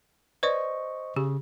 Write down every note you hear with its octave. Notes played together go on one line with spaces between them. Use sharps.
B4 C5 D5 D#5 C#6
C#3 G4